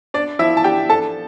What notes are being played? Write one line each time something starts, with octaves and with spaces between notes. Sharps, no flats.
D4 D5
F3 E4 E5
A5
D4 G4 G5
D4 A4 A5